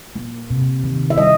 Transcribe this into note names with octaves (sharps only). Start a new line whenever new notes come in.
A#3
C3
D#3
E5
G3 D#5